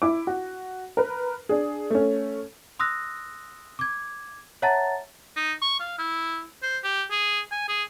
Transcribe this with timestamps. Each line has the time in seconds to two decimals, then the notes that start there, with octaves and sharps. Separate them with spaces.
0.02 E4 D6
0.27 F#4
0.97 A#4 B4
1.49 D4 G#4
1.90 A3 C#4
2.79 C6 D#6 E6 F#6 A#6
3.79 D6 G#6
4.62 C#5 E5 F#5 A5 A#5 A6
5.36 D#4
5.62 C#6
5.80 F5
5.98 E4
6.63 C5
6.84 G4
7.11 G#4
7.52 G#5
7.68 G#4